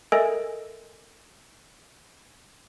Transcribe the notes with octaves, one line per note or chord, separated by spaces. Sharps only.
A4 A#4 D#5 E5 G#5 E6